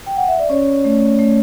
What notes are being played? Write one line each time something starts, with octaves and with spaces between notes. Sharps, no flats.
G5
F#5
E5
D5
C#4 C#5
A3
A3